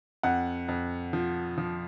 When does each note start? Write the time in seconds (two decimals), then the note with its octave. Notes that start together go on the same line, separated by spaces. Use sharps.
0.23 F2 F#5
0.68 F2
1.13 F3
1.58 F3